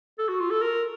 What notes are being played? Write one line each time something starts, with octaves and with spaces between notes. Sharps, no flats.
A4
F#4
F4
A4
A#4